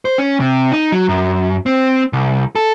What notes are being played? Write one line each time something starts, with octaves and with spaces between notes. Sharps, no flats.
C5
C#4
C3
D#4
F#3
F#2
C4
C2
A4